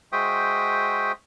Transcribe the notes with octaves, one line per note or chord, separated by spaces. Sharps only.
G#3 F#4 C5 E5 G5 D#6